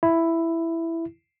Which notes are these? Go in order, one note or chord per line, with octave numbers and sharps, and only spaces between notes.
E4